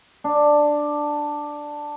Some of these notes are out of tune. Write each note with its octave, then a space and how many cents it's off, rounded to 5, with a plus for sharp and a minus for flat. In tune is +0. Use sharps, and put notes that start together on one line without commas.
D4 +5